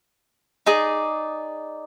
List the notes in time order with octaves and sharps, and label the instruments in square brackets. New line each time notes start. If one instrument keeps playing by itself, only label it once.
[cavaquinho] D#4 G#4 D5